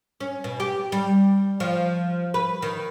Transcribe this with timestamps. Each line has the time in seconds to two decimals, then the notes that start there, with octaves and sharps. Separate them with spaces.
0.20 C#4
0.44 B2
0.60 G4
0.92 G3
1.60 F3
2.34 B4
2.62 D#3